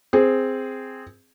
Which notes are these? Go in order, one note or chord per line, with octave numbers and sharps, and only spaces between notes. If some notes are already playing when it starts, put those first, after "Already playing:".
C4 G#4